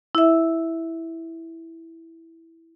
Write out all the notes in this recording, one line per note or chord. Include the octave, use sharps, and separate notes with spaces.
E4 E5